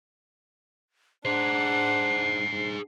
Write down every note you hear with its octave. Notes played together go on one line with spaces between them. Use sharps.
D4 G#4 C5 F#5 C7